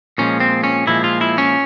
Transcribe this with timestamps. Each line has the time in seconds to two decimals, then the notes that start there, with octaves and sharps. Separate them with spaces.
0.18 A#2 F3 G#3 C#4
0.40 C4
0.64 C#4
0.87 A#2 F3 G#3 E4
1.04 F4
1.21 E4
1.38 C#4